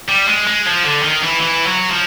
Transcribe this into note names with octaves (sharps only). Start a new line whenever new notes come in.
G3
G#3
G#3
F3
D3
D#3
E3
E3
F#3
F3